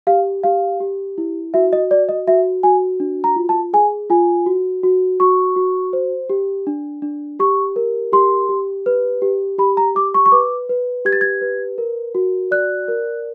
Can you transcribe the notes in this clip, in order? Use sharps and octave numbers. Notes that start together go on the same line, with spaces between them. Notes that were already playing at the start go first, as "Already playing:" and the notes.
G4 F5
G4 F5
G4
E4
F#4 E5
D#5
D5
D#5
F#4 E5
F#4 G#5
D4
A#5
F4
A5
G#4 G#5
F4 G#5
F#4
F#4
F#4 C#6
F#4
C5
G4
D4
D4
G4 C#6
A#4
G4 C6
G4
B4
G4
G4 B5
A#5
G4 D6
C#6
C#6
B4 D6
B4
G4 G#6
A6
G#6
B4
A#4
F#4
D5 F#6
A#4